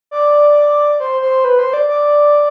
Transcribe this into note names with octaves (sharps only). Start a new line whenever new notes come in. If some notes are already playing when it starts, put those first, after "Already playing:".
D5
C5
C5
B4
C5
D5
D5